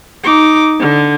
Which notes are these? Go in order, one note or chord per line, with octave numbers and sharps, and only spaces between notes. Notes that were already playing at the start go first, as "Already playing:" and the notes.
D#4 D6
D3